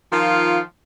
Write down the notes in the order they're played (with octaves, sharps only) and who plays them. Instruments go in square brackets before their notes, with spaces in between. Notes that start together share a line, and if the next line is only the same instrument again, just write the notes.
[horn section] D#3 F3 F4